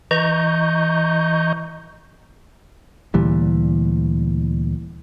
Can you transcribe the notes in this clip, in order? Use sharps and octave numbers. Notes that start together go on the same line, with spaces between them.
E3 D#5 A#5 C#6 G6
D2 A#2 E3 G3